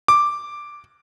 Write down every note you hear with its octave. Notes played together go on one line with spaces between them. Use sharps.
D6